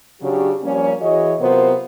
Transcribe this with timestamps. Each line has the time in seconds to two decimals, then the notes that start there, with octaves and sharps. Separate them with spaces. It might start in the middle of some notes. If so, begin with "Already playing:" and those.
0.21 C#3 F#3 D4 G4
0.63 F3 G3 A#3 C#4
1.01 E3 F#4 G#4 C#5 D#5
1.40 C3 F#3 B3 F4 A#4 C5